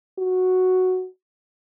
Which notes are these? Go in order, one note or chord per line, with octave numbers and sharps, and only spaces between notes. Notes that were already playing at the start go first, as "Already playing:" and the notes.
F#4